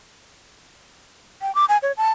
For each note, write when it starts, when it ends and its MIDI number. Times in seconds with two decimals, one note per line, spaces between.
1.42 1.54 79
1.55 1.65 86
1.69 1.77 80
1.83 1.92 73
1.97 2.11 81